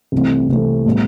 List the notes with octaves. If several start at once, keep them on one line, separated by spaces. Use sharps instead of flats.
C2 C3 E3 A3 C4
C2 C3 E3 A3 C4
A2 G3 B3